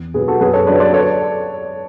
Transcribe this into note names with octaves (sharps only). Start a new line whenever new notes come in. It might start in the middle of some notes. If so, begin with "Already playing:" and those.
Already playing: E2
B2 G#4 B4
F#3
F#4 A4
F#2 G#4 B4
A4 C#5
D3 F#3 B4 D5
C#5
B4 D5
A4 C#5